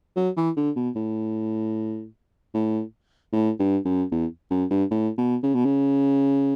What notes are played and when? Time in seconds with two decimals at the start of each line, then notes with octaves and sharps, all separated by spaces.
0.16 F#3
0.37 E3
0.57 D3
0.76 B2
0.96 A2
2.54 A2
3.33 A2
3.59 G2
3.85 F#2
4.12 E2
4.51 F#2
4.71 G2
4.91 A2
5.18 B2
5.43 C#3
5.55 B2
5.65 C#3